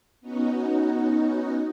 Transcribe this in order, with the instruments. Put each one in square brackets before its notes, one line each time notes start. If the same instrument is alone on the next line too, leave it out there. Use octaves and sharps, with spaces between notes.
[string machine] B3 C#4 D#4 F#4